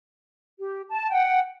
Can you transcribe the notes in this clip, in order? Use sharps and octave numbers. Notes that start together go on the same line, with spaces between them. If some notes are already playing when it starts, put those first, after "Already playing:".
G4
A5
F#5 G5